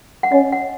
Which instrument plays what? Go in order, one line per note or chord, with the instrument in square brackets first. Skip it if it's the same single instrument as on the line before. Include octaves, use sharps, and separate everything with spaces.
[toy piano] F#5
[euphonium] C#4 [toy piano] D#5
[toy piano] F#5